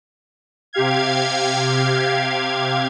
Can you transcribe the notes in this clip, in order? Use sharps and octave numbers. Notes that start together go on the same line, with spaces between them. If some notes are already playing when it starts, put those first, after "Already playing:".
C3 G4 F5 G#6